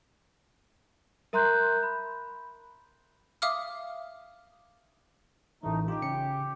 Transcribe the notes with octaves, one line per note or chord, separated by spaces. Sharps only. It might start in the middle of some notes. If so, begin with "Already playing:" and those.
A#4 E5 A#5 C6 F#6 G6
B5
E5 F5 D6 D#6 F6
A1 E3 A3 D#4
D#4 F4 G4
C#3 C#4 C#7